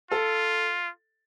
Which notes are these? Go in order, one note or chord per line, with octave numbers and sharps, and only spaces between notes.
F4 A4